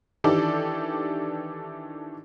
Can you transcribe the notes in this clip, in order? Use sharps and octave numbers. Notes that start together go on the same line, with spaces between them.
D#3 E3 D4 G4 A4 D5